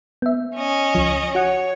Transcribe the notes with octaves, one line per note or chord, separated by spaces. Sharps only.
B3 E5
C#4 D#5
C#2 F3
F#4 C#5 F#5